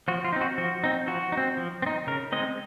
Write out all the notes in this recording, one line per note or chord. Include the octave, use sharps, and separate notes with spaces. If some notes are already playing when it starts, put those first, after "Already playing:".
F3 F#4
F4
C4 D#4
F#4
F3 F#4
C4 D#4
F3 F#4
D#4
C4
F3
C4
D#4
C#3 A#4
G#3 C4 D#4 D#5